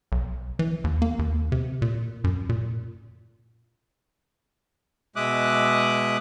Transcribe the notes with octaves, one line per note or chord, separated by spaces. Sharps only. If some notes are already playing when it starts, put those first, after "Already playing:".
B1
E3
D#2
A#3
D#2
C3
A#2
F#2
A#2
B2 G#3 E5 D6 D#6 F#6